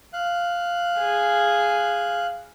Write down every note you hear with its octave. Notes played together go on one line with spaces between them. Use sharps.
F5 F#6
G#4